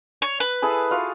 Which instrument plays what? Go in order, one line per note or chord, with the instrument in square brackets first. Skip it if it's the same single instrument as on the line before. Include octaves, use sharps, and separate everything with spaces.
[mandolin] C#5
B4
[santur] E4 G#4 A4
F4 F#4 F5